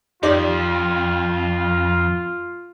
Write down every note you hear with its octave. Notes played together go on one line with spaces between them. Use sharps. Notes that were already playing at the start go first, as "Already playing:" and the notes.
F2 D#4 F4 G4 D5